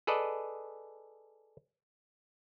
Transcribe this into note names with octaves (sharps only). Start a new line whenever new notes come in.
G#4 A4 B4 D5 D#5